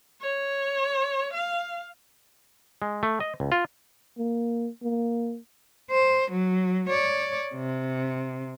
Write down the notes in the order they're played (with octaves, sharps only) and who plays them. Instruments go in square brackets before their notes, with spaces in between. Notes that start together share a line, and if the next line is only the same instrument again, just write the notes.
[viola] C#5
F5
[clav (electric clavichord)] G#3
A3
D#5
C#2
F4
[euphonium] A#3
A#3
[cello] C5
F#3
C#5 D5
C3